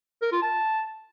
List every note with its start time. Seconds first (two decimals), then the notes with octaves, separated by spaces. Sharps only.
0.22 A#4
0.32 F4
0.42 A5